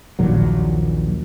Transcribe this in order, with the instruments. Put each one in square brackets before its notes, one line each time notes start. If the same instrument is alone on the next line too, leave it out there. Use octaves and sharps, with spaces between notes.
[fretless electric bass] A#1 D#2 A#2 F#3